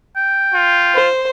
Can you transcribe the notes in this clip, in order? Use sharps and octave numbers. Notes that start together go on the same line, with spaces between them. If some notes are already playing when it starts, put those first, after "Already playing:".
G5
F4
C5